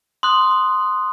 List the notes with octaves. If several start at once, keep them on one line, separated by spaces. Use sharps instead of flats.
C6 D#6 F#6